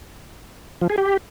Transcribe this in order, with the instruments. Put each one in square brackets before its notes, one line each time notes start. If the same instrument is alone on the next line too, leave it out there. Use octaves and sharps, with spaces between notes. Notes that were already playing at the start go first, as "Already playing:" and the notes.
[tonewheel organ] F3
G#4
G4